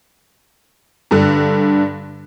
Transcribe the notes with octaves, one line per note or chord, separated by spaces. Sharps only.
G2 D3